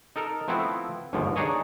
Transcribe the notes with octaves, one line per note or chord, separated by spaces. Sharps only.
D#4 A4 A#4
F3 A3 B3 C4 E4
G1 D#2 G#2 F3
D4 D#4 G#4 C#5 D#5